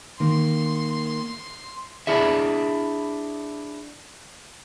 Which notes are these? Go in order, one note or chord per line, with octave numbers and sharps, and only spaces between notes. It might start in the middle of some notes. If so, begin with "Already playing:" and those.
D#3 A#3 C6
D4 E4 G#4 E5